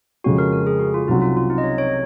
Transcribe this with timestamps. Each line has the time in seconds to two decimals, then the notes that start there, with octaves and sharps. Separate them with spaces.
0.24 F2 C#3 G#3 C#4 F#4
0.38 A#4
0.53 A#4
0.67 G#4
0.80 F#4
0.94 F4
1.08 C2 C3 F#3 C#4 D#4 F#4
1.22 F4
1.37 F4
1.50 D#4
1.58 D#5
1.63 C#5
1.78 C#5